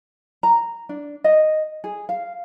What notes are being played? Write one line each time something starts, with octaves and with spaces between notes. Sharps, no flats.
A#5
D4
D#5
G#4
F5